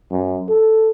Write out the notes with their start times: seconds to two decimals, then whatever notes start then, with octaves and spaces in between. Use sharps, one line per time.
0.11 F#2
0.49 A4